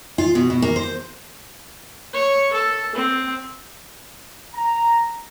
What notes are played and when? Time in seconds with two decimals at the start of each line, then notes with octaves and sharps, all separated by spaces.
0.18 F4
0.35 B2
0.50 B2
0.62 A#3
0.76 C5
2.14 C#5
2.53 A4
2.95 C4
4.54 A#5